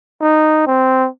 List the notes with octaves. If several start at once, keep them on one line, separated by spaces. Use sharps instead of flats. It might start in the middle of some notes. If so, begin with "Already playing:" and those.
D#4
C4